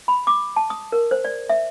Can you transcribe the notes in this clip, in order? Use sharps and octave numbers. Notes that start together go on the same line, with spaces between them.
B5
D6
A5
D#6
A#4
C5
D5
E5